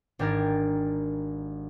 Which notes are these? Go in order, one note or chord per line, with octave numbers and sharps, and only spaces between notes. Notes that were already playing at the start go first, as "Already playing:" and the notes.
G#1 D4 G4 A#4 G#6 A6